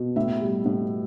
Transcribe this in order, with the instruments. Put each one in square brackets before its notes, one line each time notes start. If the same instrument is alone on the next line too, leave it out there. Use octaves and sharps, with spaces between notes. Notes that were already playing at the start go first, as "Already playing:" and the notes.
Already playing: [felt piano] B2
A2 E5
G3
A2